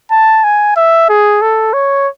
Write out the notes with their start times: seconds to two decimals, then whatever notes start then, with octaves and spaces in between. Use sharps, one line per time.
0.11 A5
0.44 G#5
0.77 E5
1.09 G#4
1.42 A4
1.74 C#5